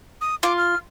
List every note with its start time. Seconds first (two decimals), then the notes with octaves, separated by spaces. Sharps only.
0.21 D#6
0.43 F4 D6
0.58 F6